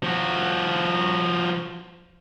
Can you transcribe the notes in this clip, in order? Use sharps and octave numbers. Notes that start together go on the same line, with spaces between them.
F3 F#4